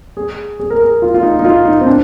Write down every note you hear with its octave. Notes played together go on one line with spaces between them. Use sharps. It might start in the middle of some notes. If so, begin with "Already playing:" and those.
G#4
G#4
A#4
G#4
F4
F4
D#4
D#4
F4
D#4
C4
D4